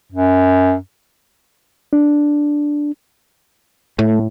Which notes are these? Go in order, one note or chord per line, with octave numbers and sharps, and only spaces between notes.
F#2
D4
A2 A3